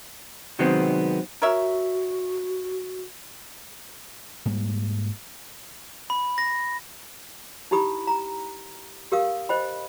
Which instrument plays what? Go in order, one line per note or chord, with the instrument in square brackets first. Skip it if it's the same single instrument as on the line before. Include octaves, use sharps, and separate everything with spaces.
[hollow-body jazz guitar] C3 D#3 F#3 G#3 B3 C4
[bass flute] F#4 [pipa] A#4 C#5 E5
[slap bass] G#2 G3 A#3
[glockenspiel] B5
A#6
[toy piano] D#4 E4 G4 B5 D#6
A#5
G4 A#4 F5 D#6
C5 D#5 G5 B5